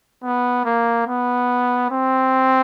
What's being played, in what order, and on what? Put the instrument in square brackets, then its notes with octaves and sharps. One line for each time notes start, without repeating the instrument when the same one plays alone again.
[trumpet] B3
A#3
B3
C4